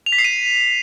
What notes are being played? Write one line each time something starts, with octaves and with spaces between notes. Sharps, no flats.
F7
B6
C7
D#7